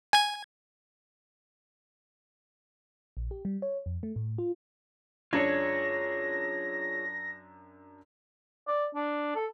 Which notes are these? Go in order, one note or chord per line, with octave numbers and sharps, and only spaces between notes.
G#5 G#6
A#1
G4
G3
C#5
F2
A3
A2
F4
F#2 D4 F4 G#4 C#5 G#6 A#6
D5
D4
A4